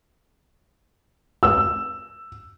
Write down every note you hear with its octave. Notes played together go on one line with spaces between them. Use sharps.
E6